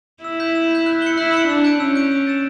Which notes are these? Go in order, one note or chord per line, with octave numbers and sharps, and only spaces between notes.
E4 E6
G6 B6
E6
G6 B6
F#6
C#7 G7
E4 F#6
C#7 G7
D4 E6
G6 D7
C#4 E6
G6 D7
E6
A6 E7